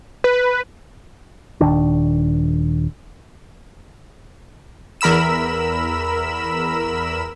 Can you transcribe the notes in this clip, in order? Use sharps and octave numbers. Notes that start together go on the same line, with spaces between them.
B4
D#1 D#2 D#3 D4
E2 A#4 B5 E6 E7